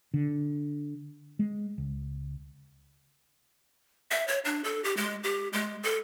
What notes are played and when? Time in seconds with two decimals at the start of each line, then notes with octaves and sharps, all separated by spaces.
0.14 D3
1.39 G#3
1.78 C#2
4.11 E5
4.28 C#5
4.45 D4
4.64 A4
4.84 G4
4.97 G#3
5.23 G4
5.53 G#3
5.83 A4